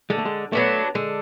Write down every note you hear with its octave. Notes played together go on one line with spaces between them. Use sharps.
D3 G#3
A3
G#3
F#3 A3 B3 D4
D3 G#3